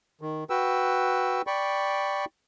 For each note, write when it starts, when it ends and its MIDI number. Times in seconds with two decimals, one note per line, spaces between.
0.21 0.44 51
0.50 1.42 66
0.50 1.42 71
0.50 1.42 79
0.50 1.42 88
1.47 2.25 74
1.47 2.25 79
1.47 2.25 83
1.47 2.25 85